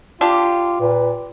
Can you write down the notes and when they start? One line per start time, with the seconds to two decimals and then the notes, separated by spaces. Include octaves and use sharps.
0.21 D4 F4 G4
0.81 A#2 B4